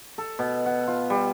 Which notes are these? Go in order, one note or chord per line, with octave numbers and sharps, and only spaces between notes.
A4
B2
F#5
F4
G3